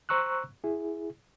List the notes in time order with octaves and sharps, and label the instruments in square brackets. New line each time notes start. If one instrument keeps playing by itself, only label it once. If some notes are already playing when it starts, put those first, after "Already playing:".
[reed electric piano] C5 A#5 C#6 E6 F#6
E4 G#4